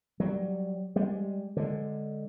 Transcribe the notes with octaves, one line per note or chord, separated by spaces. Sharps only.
F#3 G3
G3 G#3
D3 G#3